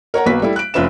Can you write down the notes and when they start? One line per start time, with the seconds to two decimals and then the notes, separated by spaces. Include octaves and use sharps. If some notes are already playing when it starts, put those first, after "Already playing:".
0.14 A#4 C#5 F#5 A#5
0.26 B1 A#3 B4 B6
0.42 G3 A3 E4
0.56 F#6 D7
0.74 F1 C#4 F4 B4 E5 E7